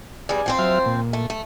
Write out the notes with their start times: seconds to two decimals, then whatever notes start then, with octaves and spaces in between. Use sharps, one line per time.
0.29 E2 G3 D5 G#5
0.46 F3 C4 C5
0.59 F#3 E5 F6
0.86 A#2
1.13 A3
1.30 A3